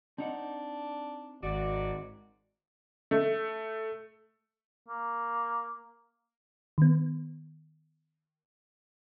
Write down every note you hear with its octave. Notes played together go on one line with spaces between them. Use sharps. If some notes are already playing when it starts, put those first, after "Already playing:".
C4 D4 D#4 F#5
G#1 F#4 D5
A3
A#3
D#3 B3